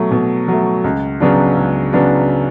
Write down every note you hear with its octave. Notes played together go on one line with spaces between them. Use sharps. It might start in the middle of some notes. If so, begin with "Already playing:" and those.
Already playing: B2 F#3 A3
B2
F#3 A3
C#2
C#3 F#3 B3 D4
C#2
C#3 F#3 B3 D4